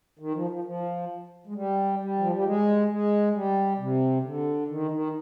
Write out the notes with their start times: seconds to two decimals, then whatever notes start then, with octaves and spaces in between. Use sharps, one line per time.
0.19 D#3
0.35 F3
0.50 F3
0.64 F3
1.47 G#3
1.55 G3
2.00 G3
2.19 F3
2.32 G3
2.44 G#3
2.89 G#3
3.33 G3
3.78 C3
4.24 D3
4.68 D#3
4.91 D#3